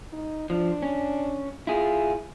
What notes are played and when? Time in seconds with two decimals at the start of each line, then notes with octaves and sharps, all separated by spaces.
0.13 D#4
0.50 F3 D4
0.82 C#4
1.67 E4 F4 G#4